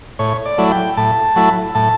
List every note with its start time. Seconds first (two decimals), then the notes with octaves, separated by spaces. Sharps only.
0.19 A2 C#5
0.46 D5
0.58 F#3 A3 E4
0.72 G5
0.97 A2 A5
1.36 F#3 A3 E4
1.75 A2 A5